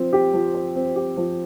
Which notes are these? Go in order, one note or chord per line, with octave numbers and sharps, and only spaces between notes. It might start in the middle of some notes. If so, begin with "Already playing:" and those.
Already playing: F3 C4 C5
G4
F3
C5
C4
G4
F3